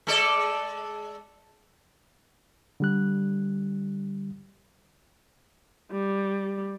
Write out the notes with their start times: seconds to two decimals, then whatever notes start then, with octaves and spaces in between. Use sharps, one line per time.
0.07 G#3 A4 D5
2.80 D3 G3 F#6
5.91 G3